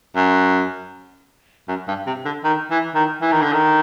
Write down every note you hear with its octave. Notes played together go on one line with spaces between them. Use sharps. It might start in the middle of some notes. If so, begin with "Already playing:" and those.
F#2
F#2
G2
C3
D3
D#3
E3
D#3
E3
D#3
D3
D#3